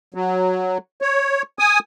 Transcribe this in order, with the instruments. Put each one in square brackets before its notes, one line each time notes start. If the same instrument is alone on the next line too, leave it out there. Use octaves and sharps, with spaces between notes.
[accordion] F#3
C#5
G#5 D#6